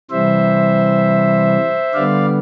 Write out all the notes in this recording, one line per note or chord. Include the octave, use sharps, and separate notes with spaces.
C3 E3 G3 C5 E5
D3 G3 B3 D5 F5